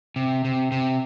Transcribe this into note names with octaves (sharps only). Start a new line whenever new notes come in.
C3
C3
C3